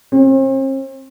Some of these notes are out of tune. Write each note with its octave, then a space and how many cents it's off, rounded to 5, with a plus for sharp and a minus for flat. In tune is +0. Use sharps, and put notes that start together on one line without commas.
C4 +45